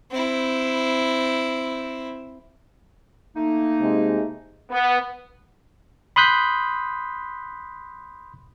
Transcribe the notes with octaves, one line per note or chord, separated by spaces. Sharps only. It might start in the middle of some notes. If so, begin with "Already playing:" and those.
C4 E4
A3 A#3 D#4
C3 G#3
B3
B5 C6 D#6 F#6 G6 B6